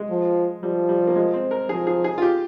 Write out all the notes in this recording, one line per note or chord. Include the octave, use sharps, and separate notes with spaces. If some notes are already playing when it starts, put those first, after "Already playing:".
Already playing: G#3
F3
F3 G3
G3
A#3
G#3
C4
A#4
F3 G#4
G#4
G#4
F4
G4